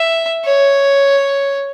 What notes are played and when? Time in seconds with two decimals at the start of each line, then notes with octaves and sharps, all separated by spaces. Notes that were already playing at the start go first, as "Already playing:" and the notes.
Already playing: E5
0.44 C#5